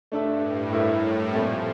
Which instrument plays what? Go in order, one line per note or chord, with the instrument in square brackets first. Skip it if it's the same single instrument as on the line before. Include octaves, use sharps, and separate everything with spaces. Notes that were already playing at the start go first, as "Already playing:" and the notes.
[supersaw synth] G2 [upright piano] A3 D4 A4 E5
[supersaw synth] A2
[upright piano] A3 E4 A#4 E5
[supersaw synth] G3
[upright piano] A#2 A3 C4 [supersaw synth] F3